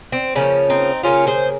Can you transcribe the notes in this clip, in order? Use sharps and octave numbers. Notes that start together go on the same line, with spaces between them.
C4
C#3 F3 A#3 C#4
C4 D#4
C#3 F3 A#3 C#4 F4
G#4 C5